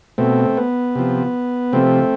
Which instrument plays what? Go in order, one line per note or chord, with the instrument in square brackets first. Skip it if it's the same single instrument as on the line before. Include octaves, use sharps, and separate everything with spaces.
[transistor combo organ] B2 A3 C4
B3
C3 F3
C3 F3 A3 C4